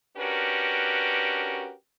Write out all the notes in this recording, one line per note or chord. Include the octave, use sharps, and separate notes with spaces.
C#4 D4 F#4 G4 A#4 B4